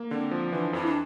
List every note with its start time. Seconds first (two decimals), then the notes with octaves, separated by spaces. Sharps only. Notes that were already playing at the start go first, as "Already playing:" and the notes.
Already playing: A#3
0.11 D3 C4
0.31 F3
0.52 E3 D4
0.73 F2 E4
0.86 D4